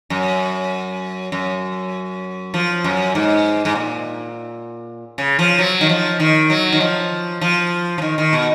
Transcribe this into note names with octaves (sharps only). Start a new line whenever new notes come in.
F#2
F#2
F3
F#2
G#2
G#2
A#2
C#3
F3
F#3
D#3
F3
D#3
F#3
D#3
F3
F3
F3
D#3
D#3
B2